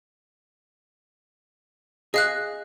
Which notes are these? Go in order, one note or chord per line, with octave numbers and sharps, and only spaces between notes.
G#4 D#5 F5 F#6